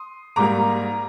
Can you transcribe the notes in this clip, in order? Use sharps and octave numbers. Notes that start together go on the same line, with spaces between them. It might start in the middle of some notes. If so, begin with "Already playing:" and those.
Already playing: C6 D#6
G#2 G3 A#3 A#5 D6